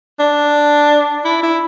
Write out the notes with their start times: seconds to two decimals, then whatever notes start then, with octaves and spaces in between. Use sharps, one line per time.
0.20 D4
1.25 E4
1.43 E4